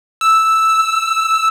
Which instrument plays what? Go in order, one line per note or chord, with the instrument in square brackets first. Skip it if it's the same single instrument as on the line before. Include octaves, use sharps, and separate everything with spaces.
[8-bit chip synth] E6